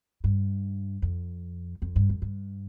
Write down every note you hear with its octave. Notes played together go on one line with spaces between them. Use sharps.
G2
F2
F2
G2
F2
G2